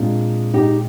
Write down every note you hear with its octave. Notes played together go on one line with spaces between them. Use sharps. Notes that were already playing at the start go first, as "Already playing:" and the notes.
Already playing: A#2 G#3 C4 D4 F4
D#4 G4